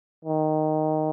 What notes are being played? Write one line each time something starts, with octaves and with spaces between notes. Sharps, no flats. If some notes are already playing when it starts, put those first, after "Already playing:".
D#3